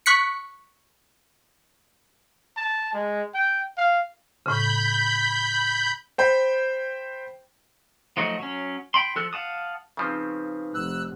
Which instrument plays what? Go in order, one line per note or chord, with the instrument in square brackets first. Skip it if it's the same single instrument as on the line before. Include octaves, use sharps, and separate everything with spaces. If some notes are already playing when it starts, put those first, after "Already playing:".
[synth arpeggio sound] C#6 F#6 B6 C#7
[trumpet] A5
G#3
G5
F5
[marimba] A2 C#3 [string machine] B5 G6
[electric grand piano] C5 G5 B5
[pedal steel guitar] F3 F#3 A3 D#4 F#4
F#3 C#4
G5 B5 C6
F3 A4 E6 F#6
F5 F#5 A5 D#6
[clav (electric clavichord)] C#3 F3 C4 [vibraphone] D#4 B4
[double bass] F1 [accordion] E6 F#6